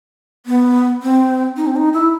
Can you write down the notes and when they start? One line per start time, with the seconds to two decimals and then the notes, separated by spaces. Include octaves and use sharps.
0.46 B3
1.02 C4
1.57 D#4
1.67 C4
1.76 D#4
1.94 E4